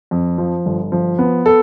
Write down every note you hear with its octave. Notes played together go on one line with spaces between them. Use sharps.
F2
F3
G1
F3
B3
A4